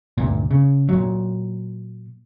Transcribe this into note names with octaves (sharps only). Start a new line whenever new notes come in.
D2 G2 A#2
C#3
A#2 F#3